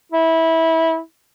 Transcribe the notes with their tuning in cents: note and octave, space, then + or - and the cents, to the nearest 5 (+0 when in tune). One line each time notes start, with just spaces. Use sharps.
E4 -20